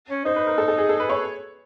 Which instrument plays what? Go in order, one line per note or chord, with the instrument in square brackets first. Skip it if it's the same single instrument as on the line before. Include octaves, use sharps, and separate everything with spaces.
[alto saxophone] C#4
[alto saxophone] D#4 [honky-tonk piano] C5
[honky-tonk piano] B4
A#4
A4
A4
G#4
A4
B4
C#5